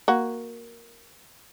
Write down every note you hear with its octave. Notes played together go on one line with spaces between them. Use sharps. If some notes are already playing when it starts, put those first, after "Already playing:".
A#3 F#4